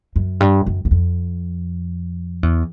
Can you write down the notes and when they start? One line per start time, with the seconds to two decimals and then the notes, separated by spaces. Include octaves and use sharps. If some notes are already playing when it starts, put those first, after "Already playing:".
0.16 F#2
0.40 G2
0.66 F#2
0.85 E2
0.91 F2
2.43 E2